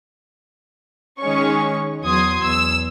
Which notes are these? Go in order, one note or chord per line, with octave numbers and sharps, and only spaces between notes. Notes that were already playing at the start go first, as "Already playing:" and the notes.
D#3 G#3 C#4 C#6
E2 F#3 C6 D#6 G#6
E2 E6